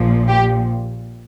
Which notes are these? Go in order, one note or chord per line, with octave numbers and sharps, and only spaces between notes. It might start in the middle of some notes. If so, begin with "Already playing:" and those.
Already playing: A#1 A#2 F3
G4